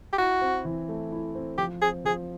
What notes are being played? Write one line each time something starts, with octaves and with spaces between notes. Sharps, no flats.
G4
E4 F#4
C4
E3
A3
E4
C4
F3 G4
C4 G#4
F3 G#4